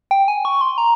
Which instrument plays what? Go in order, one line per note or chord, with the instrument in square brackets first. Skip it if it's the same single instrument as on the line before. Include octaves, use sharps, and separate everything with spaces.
[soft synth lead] G5
G#5
C#6
C6
A#5